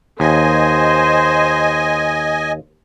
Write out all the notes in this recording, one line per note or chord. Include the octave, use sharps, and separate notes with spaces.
D#2 C5 D#5 G#5